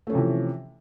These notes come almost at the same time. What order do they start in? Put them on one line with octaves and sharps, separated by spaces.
A3 C#4 F3 C3 E3